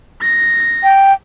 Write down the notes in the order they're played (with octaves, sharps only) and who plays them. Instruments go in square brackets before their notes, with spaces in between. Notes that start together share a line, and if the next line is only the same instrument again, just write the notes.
[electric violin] A#6
[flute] G5